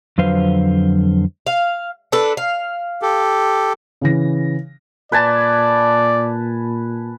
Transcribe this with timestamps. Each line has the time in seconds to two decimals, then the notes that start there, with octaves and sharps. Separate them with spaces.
0.18 F2 D3 F#3 B4 C5 F5
1.47 F5
2.12 D4 A4 B4
2.37 F5
3.02 G4 A4
4.01 C#3 E3 A#6
5.12 A#2 B4 D5 G#5 A5